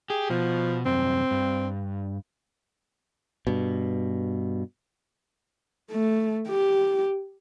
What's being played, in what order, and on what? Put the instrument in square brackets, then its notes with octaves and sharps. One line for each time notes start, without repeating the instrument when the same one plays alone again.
[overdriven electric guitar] G4 [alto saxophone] G#4
[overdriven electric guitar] B2 [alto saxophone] F3
[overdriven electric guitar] C2 F#2 [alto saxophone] C4
[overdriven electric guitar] G2
[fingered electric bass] G2 B2
[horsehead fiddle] A3
G4